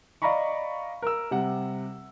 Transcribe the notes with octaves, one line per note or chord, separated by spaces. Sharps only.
D5 D#5 F5 A#5 B5 C#6
A#4 E6
C3 G3 F#5